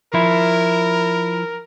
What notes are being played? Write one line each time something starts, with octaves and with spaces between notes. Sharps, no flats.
F3 E4 A#4